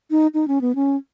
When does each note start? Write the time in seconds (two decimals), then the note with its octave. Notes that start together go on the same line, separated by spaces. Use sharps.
0.11 D#4
0.34 D#4
0.48 C#4
0.61 B3
0.75 C#4